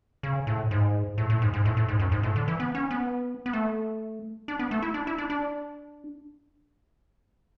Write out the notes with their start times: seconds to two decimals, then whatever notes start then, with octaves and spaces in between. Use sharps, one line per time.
0.23 C#3
0.47 A2
0.71 G#2
1.18 A2
1.30 A2
1.42 G#2
1.53 G#2
1.65 A2
1.77 A2
1.89 G#2
2.00 F#2
2.12 G#2
2.23 A2
2.36 D3
2.48 E3
2.60 B3
2.75 C#4
2.91 B3
3.46 B3
3.53 A3
4.48 D4
4.59 B3
4.71 A3
4.82 E4
4.94 D4
5.07 E4
5.18 D4
5.30 D4